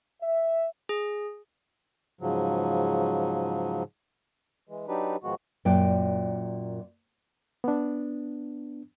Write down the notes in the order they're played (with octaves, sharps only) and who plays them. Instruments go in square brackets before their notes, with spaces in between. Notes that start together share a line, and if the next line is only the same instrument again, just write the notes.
[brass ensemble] E5
[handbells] G#4
[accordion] G#2 C#3 F3 F#3
E3 G#3
F#3 D4 D#4 G4 B4
G#2 D#3 F3 G#3 B3 F#4
[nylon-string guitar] F#2 A#2 D5 G5
[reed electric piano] B3 D4